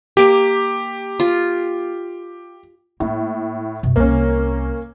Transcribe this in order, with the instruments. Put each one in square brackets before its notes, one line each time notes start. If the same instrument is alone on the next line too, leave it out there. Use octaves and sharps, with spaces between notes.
[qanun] A#3 D6 [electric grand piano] G4
[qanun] F4
[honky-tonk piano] A2 [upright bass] A#3
[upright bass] F#2 B2
[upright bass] C2 [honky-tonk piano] A#3 C#4